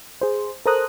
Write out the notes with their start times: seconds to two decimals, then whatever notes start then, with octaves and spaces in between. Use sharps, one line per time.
0.21 G#4 C5
0.66 A4 A#4 C5 A#5 D#6 F#6